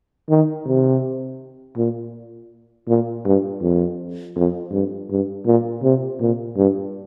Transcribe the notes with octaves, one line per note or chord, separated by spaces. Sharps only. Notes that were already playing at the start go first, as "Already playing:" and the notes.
D#3
C3
A#2
A#2
G2
F2
F2
G2
G2
A#2
C3
A#2
G2